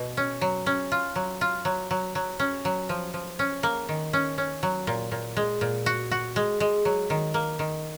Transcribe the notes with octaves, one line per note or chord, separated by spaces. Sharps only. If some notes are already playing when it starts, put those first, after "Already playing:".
Already playing: B2
C#4
F#3
C#4
F4
F#3
F4
F#3
F#3
F#3
C#4
F#3
F3
F3
C#4
A#3
D#3
C#4
C#4
F#3
A#2
A#2
G#3
A#2
F#4
F#4
G#3
G#3
F#3
D#3
A#3
D#3